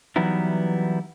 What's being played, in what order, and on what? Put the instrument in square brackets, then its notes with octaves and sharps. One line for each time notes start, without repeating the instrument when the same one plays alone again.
[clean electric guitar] E3 F#3 G3 B3 D#4 E4